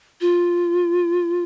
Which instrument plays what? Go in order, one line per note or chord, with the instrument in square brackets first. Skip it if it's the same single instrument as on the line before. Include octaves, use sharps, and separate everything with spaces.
[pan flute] F4